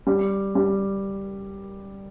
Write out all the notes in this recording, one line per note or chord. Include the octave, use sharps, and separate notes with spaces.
G3
G3